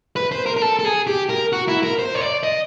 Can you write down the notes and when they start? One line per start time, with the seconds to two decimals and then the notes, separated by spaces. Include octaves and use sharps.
0.16 B4
0.32 C5
0.46 A#4
0.56 A#4
0.61 A4
0.79 A4
0.85 G#4
1.07 G4
1.29 A#4
1.52 F#4
1.68 E4
1.83 A#4
1.99 C5
2.15 C#5
2.21 D5
2.43 D#5